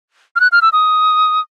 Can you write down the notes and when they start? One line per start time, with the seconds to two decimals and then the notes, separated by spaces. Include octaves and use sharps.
0.36 F6
0.40 F#6
0.52 F6
0.62 E6
0.73 D#6